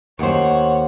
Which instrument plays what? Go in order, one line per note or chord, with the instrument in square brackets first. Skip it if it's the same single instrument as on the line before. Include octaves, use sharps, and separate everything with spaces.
[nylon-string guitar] D#2 C5 [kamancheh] C#5 F#5